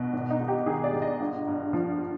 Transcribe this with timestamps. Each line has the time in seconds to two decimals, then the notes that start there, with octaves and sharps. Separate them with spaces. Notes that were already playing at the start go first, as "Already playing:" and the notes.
Already playing: B2
0.13 G#1
0.30 D#4
0.40 G#2
0.48 G4
0.66 D#3 G#4
0.84 D5
0.93 G#1
1.02 D#5
1.20 G1
1.47 G2
1.73 F3